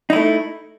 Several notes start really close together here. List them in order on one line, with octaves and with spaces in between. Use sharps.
D#4 E4 A3